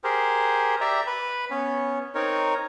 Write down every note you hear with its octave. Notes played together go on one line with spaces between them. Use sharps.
G4 G#4 A#4 C5
G4 D5 E5 A#5
B4 B5
B3 C#4
C4 D#4 A#4 C#5